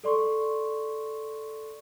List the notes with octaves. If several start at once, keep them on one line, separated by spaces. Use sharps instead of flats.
A4 D5 C6 C#6